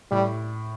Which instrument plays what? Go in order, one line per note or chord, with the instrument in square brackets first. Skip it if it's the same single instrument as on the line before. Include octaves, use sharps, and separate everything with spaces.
[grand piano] A2 [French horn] G3